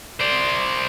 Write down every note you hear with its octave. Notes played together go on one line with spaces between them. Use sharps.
C5 D5